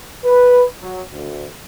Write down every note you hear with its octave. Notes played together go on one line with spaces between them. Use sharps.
B4
F#3
D2